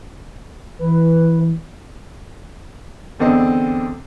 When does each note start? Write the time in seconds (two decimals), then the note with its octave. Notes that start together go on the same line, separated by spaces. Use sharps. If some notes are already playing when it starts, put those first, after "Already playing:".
0.79 E3 B4
3.19 E2 D3 C4 D#5